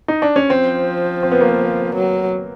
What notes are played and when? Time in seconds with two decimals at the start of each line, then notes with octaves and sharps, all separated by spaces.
0.08 D#4
0.22 D4
0.36 C#4
0.50 F3 C4
1.23 C4
1.32 B3
1.41 A#3
1.49 B3
1.95 F#3